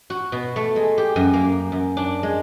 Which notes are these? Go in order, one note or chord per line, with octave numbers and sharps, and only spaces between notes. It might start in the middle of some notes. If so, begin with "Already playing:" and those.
F#4
B2
A3
G#3
G4
F#2
A#3
F#2
D4
G#3